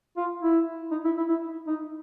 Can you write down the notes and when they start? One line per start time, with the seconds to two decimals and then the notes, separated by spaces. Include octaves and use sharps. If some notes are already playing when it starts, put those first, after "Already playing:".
0.17 F4
0.42 E4
0.91 D#4
1.05 E4
1.17 E4
1.29 E4
1.67 D#4